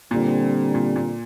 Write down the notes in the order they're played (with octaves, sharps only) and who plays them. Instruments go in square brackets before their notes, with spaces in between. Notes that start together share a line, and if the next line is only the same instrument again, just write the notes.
[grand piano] A#2 [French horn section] D3 G3 C4
[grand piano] A#2
A#2